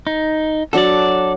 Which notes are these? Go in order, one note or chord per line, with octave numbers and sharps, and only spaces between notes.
D#4
F#3 D4 A4 D5 F#5